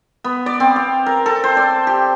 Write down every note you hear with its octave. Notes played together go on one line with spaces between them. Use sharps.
B3
D5
C4
F5
A#4
A4
C5
D5
G4